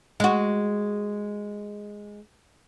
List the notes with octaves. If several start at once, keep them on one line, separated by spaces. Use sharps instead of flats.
G#3 F#4